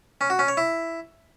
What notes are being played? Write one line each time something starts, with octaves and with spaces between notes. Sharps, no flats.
C#4
F#4
C#4
C#5
E4